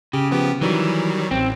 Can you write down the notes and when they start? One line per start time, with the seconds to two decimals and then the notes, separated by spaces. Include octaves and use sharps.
0.13 C#3 G4
0.31 F3 B3 G4
0.61 D#3 E3 F#3 G3
1.31 A1 C4